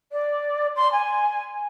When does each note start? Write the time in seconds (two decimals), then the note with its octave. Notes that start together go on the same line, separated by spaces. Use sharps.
0.12 D5
0.75 C6
0.92 G#5